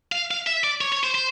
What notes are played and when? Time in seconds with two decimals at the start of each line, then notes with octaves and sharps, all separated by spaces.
0.12 F5
0.31 F5
0.47 E5
0.64 D5
0.81 C#5
0.92 C#5
1.04 C5
1.15 C5